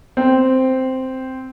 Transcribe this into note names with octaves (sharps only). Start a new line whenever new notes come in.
C4